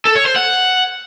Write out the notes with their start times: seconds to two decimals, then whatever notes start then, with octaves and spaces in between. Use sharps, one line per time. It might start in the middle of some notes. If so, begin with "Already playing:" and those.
0.05 A4
0.16 C#5
0.26 C5
0.36 F#5